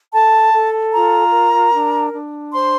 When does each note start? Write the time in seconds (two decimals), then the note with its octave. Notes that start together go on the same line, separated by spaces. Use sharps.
0.12 A4 A5
0.53 A4
0.93 F4 A#5
1.32 A#4
1.73 D4
2.13 D4
2.52 C5 C6